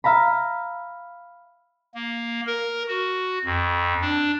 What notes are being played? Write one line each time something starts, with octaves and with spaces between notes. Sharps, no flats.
E5 F5 A#5 B5
A#3
A#4
F#4
F2
D4